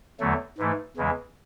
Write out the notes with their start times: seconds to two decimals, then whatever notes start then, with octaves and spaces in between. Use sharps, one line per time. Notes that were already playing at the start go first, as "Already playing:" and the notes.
0.20 E2 D3 F#3 A3
0.58 G#2 E3 A3
0.97 E2 C#3 E3 G#3